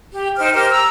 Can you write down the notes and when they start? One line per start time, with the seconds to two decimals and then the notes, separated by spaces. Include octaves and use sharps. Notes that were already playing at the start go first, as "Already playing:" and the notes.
0.13 G4
0.37 D#4 C5 G5 F6
0.53 G4 A#4 C5 F6
0.71 A#5 E6